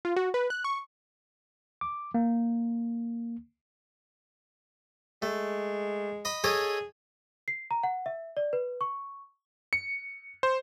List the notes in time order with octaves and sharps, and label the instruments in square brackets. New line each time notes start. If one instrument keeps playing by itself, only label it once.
[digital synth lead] F4
F#4
B4
F#6
C#6
[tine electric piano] D6
A#3
[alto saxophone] G#3 [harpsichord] A3
[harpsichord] D#5 B5
[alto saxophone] G#4 [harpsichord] A4 C#5 D#5
[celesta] C7
A#5
F#5
E5
D5
B4
C#6
[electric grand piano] C#7
C5